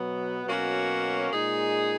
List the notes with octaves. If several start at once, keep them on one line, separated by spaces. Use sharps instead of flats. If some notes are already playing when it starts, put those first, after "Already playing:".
Already playing: B2 F#3 B3
B2 F#3 A#3 C#4 F#4
A#2 G#3 D#4 G#4